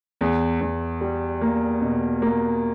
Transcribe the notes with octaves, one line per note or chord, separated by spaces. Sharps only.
E2
E2
G3
A#3
B2
A#3